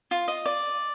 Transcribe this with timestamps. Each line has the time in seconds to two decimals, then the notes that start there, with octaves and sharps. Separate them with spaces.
0.11 F4
0.28 D#5
0.46 D5